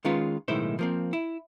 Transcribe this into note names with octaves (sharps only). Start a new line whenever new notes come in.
D#3 G#3 C#4 F4 B4
B1 A2 D#3 G#3 E4 C5
F3 A#3 C4
E4